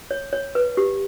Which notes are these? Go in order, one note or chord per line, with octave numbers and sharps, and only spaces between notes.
C#5
C#5
B4
G4